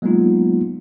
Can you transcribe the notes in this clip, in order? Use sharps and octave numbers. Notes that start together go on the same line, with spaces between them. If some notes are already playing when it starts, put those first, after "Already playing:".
F#3 G#3 A#3 B3 D#4 F4